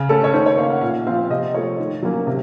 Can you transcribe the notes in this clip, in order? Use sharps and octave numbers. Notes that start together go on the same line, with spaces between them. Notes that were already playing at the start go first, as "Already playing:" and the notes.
Already playing: C#3
A3 C#4 A4
C#5
D#3 C5
C#5
A#3 F5
C#4
F#5
A#2 F5
F3 C4 F5
C3 D#5
F3 A3 C#5
D#3
F#3 A#3 C#4
C3